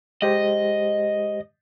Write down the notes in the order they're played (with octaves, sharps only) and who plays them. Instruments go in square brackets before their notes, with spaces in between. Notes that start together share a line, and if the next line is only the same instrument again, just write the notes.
[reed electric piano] G#3 G4 C5 [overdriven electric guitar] D#5